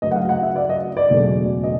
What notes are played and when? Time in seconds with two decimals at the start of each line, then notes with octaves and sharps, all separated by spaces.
0.02 D2 C#3 F#3 D#5
0.11 F#5
0.16 F5
0.29 F#5
0.43 E5
0.56 D5
0.69 D#5
0.97 D5
1.10 E1 D2 C#3 F#3 A3
1.64 D#5